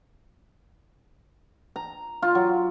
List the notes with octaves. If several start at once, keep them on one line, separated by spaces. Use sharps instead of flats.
A#5
F4
F#3